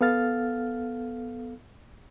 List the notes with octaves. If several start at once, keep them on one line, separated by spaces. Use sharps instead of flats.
B3 A4 F5 F6 A6